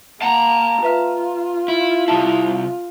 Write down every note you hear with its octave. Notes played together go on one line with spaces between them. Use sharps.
A#3 F#5 A5 A#5
F4 B4 E5 F6
E4
C2 E4 A5